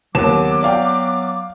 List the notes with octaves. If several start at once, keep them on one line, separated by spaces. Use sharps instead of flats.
D#2 F#3 B3 D6 E7
D5 F5 G5